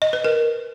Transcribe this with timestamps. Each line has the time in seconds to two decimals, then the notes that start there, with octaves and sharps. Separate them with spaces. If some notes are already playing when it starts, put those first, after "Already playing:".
0.02 D#5
0.13 B4
0.24 A#4